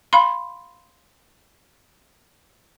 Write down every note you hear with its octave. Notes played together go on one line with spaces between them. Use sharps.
F5 B5 C6